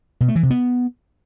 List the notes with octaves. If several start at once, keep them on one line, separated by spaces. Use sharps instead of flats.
B2
A3
E3
C3
B3